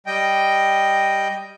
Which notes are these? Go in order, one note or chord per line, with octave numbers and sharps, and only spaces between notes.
G3 D#5 G5